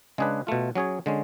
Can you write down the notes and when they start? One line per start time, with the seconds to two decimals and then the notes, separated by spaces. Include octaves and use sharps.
0.18 C#3 G#3 D4 G#4 B4
0.47 B2 A3 F4
0.75 F#3 C#4 G#4 C#5
1.06 D3 G#3 C#4